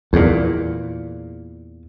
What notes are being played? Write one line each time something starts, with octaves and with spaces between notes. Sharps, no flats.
E2 A#2